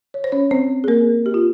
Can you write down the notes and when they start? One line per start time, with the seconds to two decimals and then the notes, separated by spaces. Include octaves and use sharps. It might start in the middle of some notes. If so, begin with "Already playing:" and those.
0.14 C#5
0.24 C5
0.32 C#4 C#5
0.51 C4 C5
0.84 G#4
0.88 A#3 A#4
1.26 G4
1.34 F4